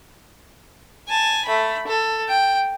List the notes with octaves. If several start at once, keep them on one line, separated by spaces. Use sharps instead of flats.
G#5 A5
A3 B5
A4
G5